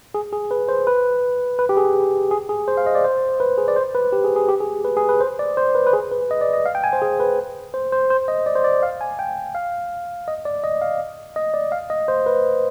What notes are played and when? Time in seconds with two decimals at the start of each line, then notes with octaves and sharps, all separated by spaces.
0.15 G#4
0.32 G#4
0.51 B4
0.69 C5
0.87 B4
1.59 B4
1.69 G4
1.77 G#4
2.31 G#4
2.49 G#4
2.68 C5
2.77 F5
2.86 D#5
2.95 D5
3.04 C5
3.40 B4
3.58 G#4
3.68 D5
3.76 C5
3.95 B4
4.12 G4
4.24 G#4
4.36 G#4
4.49 G4
4.60 G#4
4.84 B4
4.97 G#4
5.09 B4
5.20 C5
5.39 D5
5.57 C5
5.75 B4
5.87 B4
5.93 G#4
6.12 B4
6.31 D#5
6.41 D5
6.53 D#5
6.66 F5
6.75 G5
6.84 G#5
6.93 C5
7.02 G#4
7.20 B4
7.74 C5
7.92 C5
8.10 C5
8.28 D#5
8.46 D5
8.55 C5
8.64 D5
8.83 F5
9.01 G#5
9.19 G5
9.55 F5
10.28 D#5
10.45 D5
10.64 D#5
10.81 F5
11.36 D#5
11.54 D5
11.72 F5
11.90 D#5
12.08 C5
12.26 B4